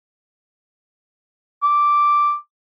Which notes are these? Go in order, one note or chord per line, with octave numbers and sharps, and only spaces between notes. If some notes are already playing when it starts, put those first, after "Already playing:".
D6